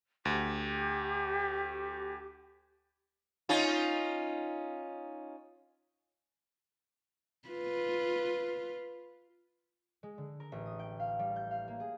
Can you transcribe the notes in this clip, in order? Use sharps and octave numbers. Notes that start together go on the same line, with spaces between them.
D2 G4
C#4 D#4 F4
F4 B4
G#3
D3
A#4
A1
D#6
G5
F5
G3
G6
F5
A#3
G#4